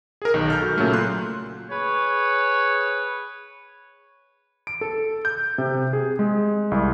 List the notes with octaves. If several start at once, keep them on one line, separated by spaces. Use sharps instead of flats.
G#4 A#4
B1 D#3
A4 F6 G6
F#4
A#2 C#3 F#3 A3 A#3
C6 F#6
G#4 B4 C#5
D7
A4
G6
C3
G#4
G#3
C2